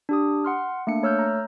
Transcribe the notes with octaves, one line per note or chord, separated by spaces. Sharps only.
D4 G4 D#6
F#5 C6 F6
A3 A#3 D4 C#7
A3 C#5 E6 F6 G6
A#5